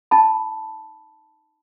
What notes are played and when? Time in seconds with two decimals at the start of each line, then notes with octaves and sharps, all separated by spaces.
0.11 D#4 A5 B5